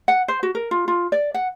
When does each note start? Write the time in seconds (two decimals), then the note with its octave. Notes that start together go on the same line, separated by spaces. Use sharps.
0.08 F#5
0.28 C5
0.43 F#4
0.55 A#4
0.71 F4
0.88 F4
1.12 D5
1.34 F#5